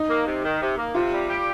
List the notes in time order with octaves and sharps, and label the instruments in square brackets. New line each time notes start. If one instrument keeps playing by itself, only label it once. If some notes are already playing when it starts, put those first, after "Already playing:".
Already playing: [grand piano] D#4
[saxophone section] A#3
C3
D#3
C3
A#3
[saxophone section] C3 [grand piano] F4
[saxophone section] G3
G4